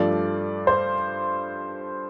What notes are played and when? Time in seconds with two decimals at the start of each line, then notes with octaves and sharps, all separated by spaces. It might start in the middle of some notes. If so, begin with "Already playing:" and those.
Already playing: G2 F3 A3 D5
0.67 C5